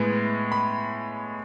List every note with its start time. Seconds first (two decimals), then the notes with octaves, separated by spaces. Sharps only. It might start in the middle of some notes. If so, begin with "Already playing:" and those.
Already playing: A2 G#3 B3
0.52 B5